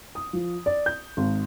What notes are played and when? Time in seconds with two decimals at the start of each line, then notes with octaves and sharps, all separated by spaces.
0.15 D#6
0.33 F3
0.66 D5
0.86 G6
1.17 G#1